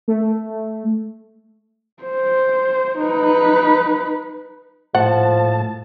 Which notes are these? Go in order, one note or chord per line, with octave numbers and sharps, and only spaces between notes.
A3
C5
D#4 B4
A2 F3 F#5 A5